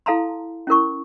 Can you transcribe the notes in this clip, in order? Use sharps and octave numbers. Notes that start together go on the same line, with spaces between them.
E4 A4 F5 A5 A#5 C6
C#4 E4 A#4 C#6